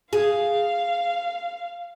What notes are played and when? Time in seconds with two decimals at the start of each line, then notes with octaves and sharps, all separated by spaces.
0.13 G#4 F5